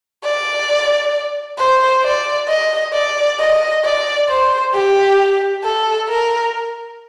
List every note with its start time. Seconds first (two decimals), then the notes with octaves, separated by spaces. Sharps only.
0.24 D5
1.58 C5
2.04 D5
2.48 D#5
2.93 D5
3.39 D#5
3.84 D5
4.29 C5
4.74 G4
5.64 A4
6.09 A#4